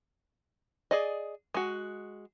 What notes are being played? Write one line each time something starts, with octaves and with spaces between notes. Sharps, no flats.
G#4 D5 D#5
G#3 F#4